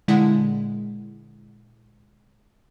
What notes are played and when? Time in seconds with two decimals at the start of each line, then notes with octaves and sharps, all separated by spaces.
0.08 A#2 D3 G#3 E4 F#5